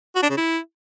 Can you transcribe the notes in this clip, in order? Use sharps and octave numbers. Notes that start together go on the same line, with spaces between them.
F#4
D4
C#3
E4